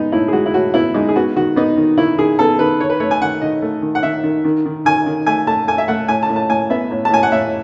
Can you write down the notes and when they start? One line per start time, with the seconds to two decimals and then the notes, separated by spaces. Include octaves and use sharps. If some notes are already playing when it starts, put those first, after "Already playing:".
Already playing: G#3 B3 D#4
0.12 A2 E4
0.28 G#4
0.33 G#3 F#4
0.46 E4
0.54 A2 F#4
0.74 B3 E4
0.94 G#3 D#4
1.09 G#4
1.16 B3 F#4
1.36 D#3 F#4
1.56 B3 D#4
1.77 D#3
1.98 D#3 E4
2.18 D#3 G#4
2.39 B3 A4
2.59 D#3 B4
2.80 D#3 C#5
2.90 B4
3.00 A3 C#5
3.11 G#5
3.21 D#3 F#5
3.42 D#3 D#5
3.62 A3
3.82 D#3
3.95 F#5
4.03 D#3 E5
4.23 D#3
4.44 D#3
4.66 D#3
4.85 D#3 G#5
5.06 D#3
5.26 A3 G#5
5.47 A3 A5
5.68 A3 G#5
5.78 E5
5.88 A3 F#5
6.08 A2 G#5
6.23 A5
6.29 A2
6.36 A5
6.50 A2 G#5
6.70 B3 E5
6.91 A2
7.05 A5
7.11 A2 G#5
7.23 F#5
7.32 A2 E5